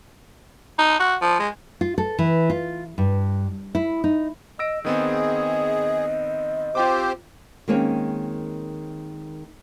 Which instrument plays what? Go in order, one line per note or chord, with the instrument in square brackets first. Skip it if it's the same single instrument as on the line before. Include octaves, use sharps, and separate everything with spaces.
[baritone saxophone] D#4
F#4
F3
G#3
[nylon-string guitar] F4
A4
E3
F4
G2
E4
D#4
[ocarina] D#5 [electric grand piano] E6 A#6 D7
[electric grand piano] D#3 B3 C4 [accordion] G#4 [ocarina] D#5
[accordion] C4 G4 C5 [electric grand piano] F4 G5 D6
[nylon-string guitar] D#3 G#3 A#3 C4 C#4